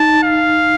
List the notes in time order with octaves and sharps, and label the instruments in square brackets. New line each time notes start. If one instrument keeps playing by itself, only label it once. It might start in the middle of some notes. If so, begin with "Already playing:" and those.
Already playing: [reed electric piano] D#4 [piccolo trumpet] A5
[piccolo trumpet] F5